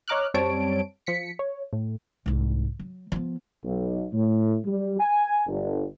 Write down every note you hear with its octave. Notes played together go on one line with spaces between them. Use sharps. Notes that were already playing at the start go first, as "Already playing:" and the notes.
C#5 D#5 A#5 D6 F6 F#6
F#2 G3 C4 C#5 A5 D7
F3 B6 C#7
C#5
A2
C2 G#2
F#3
F3 B3
B1
A2
G3
G#5
G1